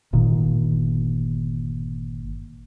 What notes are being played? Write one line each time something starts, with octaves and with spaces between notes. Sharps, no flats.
G1 A#2 D#3